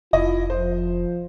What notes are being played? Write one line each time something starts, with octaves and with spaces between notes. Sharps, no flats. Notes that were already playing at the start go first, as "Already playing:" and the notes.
F1 E4 F4 D#5
F3 C5